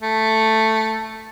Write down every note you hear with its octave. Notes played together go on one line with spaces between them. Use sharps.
A3